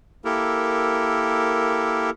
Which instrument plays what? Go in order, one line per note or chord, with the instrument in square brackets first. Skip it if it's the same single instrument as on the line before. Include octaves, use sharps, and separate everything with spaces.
[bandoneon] A#3 E4 G4 A4 A#4